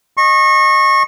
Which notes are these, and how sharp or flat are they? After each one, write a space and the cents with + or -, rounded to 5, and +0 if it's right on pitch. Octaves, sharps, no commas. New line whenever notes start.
D#5 -25 C#6 -30